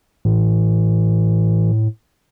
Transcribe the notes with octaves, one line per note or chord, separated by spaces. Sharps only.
A2 E3